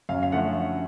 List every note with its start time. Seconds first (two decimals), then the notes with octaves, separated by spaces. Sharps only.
0.09 F#2 F5
0.23 F5
0.32 D3 F3 A3 F#5